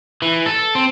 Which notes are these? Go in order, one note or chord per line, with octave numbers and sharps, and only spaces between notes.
E3
A4
C4